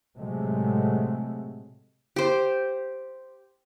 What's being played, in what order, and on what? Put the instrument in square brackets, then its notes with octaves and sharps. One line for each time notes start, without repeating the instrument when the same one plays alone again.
[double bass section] A2 C3 F#3 G#3 A3
[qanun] G4 C5